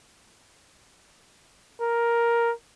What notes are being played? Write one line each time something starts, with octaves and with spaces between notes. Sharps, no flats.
A#4